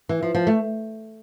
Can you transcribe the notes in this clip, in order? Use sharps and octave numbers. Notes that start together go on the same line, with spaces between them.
E3
F3
F3
A3